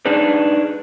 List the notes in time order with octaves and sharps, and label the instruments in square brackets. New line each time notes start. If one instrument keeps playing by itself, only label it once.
[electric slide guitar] D4 D#4 G#4 B4